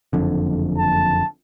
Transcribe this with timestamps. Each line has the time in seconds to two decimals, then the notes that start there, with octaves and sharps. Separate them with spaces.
0.13 F#1 F2 D3
0.78 A5